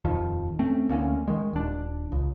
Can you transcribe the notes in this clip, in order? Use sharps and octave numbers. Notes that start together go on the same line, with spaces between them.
D#1 F2 D#3 F3
A3 C4 C#4
D2 A#3 C4 C#4
D#3 G#3
D#1 D4
C#2